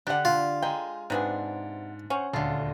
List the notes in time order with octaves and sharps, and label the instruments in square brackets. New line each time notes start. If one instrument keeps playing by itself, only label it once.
[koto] D3 G4 [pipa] D4 F#5
[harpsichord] F4
[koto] G#3 [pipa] G5 [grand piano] G#5 A#5
[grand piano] G#2 [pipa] C3 B3 G#4 [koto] D4
[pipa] C#4 [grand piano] C5 F#5
[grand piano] D#1 D2 A5 [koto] D3 F4